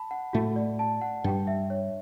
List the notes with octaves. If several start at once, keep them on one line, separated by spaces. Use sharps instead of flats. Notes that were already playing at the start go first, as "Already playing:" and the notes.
Already playing: A5 B5
F#5
A2 A3 F#4
D5
A5
F#5
G2 G3 G5
E5
C#5